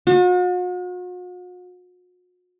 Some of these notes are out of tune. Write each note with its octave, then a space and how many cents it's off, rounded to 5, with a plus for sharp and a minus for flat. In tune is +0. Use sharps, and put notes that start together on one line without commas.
F#4 -45